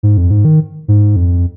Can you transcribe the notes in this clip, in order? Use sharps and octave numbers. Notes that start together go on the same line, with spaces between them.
G#2
F2
G#2
D#3
G#2
F2